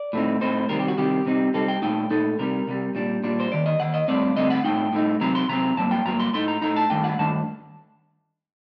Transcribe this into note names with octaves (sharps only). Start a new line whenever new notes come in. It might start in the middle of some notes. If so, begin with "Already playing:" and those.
Already playing: D5
A2 A3 C4 D#4
A2 A3 C4 D#4 C5
C3 D#3 G3 C4 A#4
G4
F#4
C3 D#3 G3 C4 G4
C3 G3 C4 D#4
C3 G3 C4 D#4 A4
G5
A#2 A3 D#4 G5
A#2 A3 D#4 A4
C2 C3 G3 A#4
C2 C3 G3
A#2 G3 D4
A#2 G3 D4
C5
D#2 D#3 D5
D#5
D#2 D#3 F#5
D#5
G2 D3 A3 C4 D5
G2 D3 A3 C4 D#5
F#5
A2 A3 D#4 G5
A2 A3 D#4
C3 F#3 C4 A#5
C6
C3 F#3 C4 A#5
G2 F#3 A#3 A5
G5
G2 F#3 A#3 A#5
C6
A2 A3 D#4 C6
A#5
A2 A3 D#4 A#5
A5
G2 D#3 A3 D4 G5
F#5
G2 D#3 A3 D4 A5